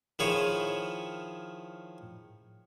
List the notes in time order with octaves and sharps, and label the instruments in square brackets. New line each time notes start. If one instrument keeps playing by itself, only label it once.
[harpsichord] D#3 F3 E4 G#4 C#5